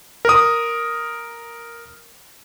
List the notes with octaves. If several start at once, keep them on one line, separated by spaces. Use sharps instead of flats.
A#4 D#6